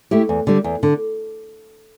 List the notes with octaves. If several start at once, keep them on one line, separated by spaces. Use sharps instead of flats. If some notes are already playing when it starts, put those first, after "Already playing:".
A3 E4 G4
E2
D3 G3
E2
D3